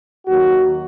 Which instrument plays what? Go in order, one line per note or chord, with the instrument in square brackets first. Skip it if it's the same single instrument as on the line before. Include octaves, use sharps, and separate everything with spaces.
[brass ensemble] D#2 D#3 F#3 A#3 F#4